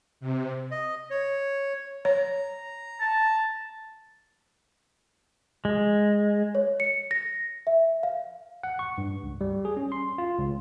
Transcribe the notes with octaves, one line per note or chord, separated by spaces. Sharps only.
C3
D#5
C#5
C#5 A#5
A5
G#3
C#5
C#7
A#6
E5
F5
F#5
C#6
G2
C#2
G3
G#4
C#4
C6
F4
C#2